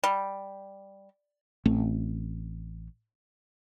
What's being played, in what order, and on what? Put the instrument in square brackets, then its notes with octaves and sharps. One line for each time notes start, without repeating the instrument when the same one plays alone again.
[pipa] G3
[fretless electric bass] A1 A3 C4